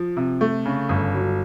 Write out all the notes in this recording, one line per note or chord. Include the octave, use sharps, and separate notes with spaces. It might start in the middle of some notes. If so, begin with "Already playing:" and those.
Already playing: F3
C3
A3
C#3
G1
F#3